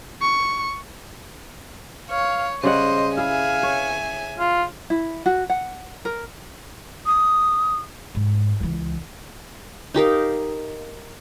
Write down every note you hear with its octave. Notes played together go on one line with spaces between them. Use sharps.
C#6
C#5 F5
C#3 G3 C5 D#5 F#5
E4 G#4 E5 F5 G#5
C#5
F4
E4
F#4
F#5
A#4
D#6
G#2
C#2 E3
D#4 G4 A#4 F5